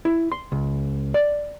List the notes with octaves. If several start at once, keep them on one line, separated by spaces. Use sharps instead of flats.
E4
C6
C#2
D5